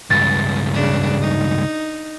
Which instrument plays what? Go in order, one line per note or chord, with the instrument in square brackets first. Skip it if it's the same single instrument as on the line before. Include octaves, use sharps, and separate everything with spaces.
[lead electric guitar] C#2 G2 [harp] A6
[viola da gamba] C#3 D4
D#4